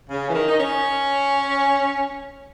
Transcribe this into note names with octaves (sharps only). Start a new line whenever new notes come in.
C#3
E3
D#3
D#4
C#4